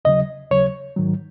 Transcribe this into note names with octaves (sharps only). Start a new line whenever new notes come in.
D#2 C#3 F#3 D#5
D#2 C#3 F#3 C#5
G#2 D#3 F#3